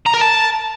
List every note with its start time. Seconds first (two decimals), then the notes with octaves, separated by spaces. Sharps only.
0.06 A#5
0.13 A#4
0.21 A5